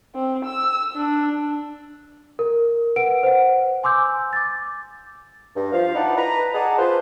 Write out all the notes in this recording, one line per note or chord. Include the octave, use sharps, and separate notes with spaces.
C4
E6
D4
A#4
B4 F#5 D7
C5 F#5
G#5 C6 D6 E6 G6
D6 A6
G2
F3 F5
D#4 E4 B4 D5 F#5 A5
B4 A#5
G#4 D5 D#5 F#5 A5
F4 B4 C5